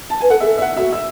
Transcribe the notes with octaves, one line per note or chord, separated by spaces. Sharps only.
A5
B4 G#5
A4 F#5
G#4 E5
A4
E5
F#5
F#4 E5 E6
E5 E6